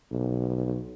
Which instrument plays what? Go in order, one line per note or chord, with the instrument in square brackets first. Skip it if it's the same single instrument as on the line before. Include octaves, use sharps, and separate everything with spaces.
[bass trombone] B1